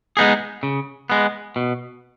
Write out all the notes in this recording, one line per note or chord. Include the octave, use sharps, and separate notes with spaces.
G#3 B3 D#4 G#4
C#3
G#3 B3
B2